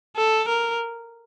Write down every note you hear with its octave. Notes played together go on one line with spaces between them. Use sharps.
A4
A#4